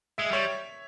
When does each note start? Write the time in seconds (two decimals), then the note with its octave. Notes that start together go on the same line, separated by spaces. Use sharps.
0.18 G#3 E5
0.31 G3 C#5